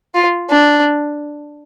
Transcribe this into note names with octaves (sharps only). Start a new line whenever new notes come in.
F4
D4